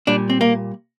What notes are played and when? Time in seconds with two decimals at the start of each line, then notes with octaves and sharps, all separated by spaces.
0.07 A#2 G3 D4
0.30 C4
0.41 A#3